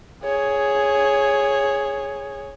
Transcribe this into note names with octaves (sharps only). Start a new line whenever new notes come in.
G#4 C#5